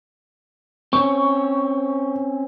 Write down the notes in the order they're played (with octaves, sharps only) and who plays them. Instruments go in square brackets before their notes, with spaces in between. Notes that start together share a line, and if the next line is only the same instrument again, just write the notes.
[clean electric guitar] C4 C#4 [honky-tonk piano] C#6